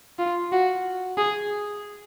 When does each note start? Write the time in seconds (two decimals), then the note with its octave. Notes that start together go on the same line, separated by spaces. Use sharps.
0.19 F4
0.52 F#4
1.18 G#4